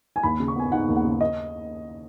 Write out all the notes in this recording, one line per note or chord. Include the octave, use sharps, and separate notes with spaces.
G#5
D#2 B5
C#3
C#6
B3 G#5
D#4 F#5
D#2
F#5
C#3
D#5